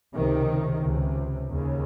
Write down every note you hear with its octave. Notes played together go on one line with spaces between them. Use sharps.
C#2 C3 D#3
C#2 C3
D#2 C#3